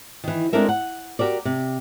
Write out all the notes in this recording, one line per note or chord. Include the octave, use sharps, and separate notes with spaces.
D#3 E3
G#3 C4 D4 A4 A#4 E5
F#5
F#4 G4 A#4 D5
C3